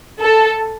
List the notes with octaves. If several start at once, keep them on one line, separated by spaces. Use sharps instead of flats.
A4